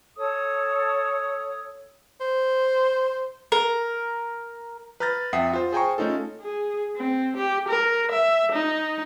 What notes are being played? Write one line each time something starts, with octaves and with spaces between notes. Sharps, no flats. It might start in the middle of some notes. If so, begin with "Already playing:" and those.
A4 C#5 D#6
C5
A#4
B4 A#5 F6 G6 A6 A#6
F2 E5 F#5 G5 D#6 C7
F4 C5
G#4 C5 G5 G#5 A#5 C#6
A3 C#4 D#4 F4 A4
G#4
C4
G4
A#4
E5
D#4